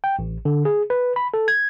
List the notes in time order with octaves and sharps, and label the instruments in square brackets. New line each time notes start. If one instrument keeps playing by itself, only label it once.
[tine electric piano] G5
A1
D3
G#4
B4
B5
A4
G#6